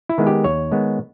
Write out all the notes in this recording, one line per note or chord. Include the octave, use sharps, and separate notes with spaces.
E4
D#3 G#3 B3
G4
D#2 C#5
D#3 G#3 B3